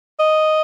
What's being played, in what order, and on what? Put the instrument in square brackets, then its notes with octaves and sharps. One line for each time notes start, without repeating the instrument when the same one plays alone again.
[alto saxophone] D#5